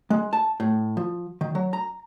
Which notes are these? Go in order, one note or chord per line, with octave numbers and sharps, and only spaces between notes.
G#3
A5
A2
F3
D#3
F#3
A#5